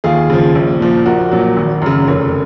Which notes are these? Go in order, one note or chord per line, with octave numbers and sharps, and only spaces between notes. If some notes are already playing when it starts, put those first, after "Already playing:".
D#2 F4 G#4
C#3 F3
A#1
A#2 F3
A#1 F#4 A#4
A#2 F#3
G#1
F#2 C#3
F1 A#4 C#5